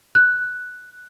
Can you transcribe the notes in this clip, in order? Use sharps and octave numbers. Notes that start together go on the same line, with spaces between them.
F#6